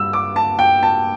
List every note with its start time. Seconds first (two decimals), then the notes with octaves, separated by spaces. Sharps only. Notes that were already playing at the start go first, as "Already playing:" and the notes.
Already playing: G2 E6
0.13 D6
0.36 A5
0.59 G5
0.83 A5